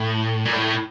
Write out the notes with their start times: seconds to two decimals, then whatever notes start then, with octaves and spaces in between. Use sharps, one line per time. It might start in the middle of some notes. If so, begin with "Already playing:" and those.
Already playing: A2
0.45 A#2
0.52 A2